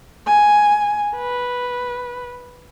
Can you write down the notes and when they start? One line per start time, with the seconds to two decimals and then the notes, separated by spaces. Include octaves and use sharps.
0.27 G#5
1.16 B4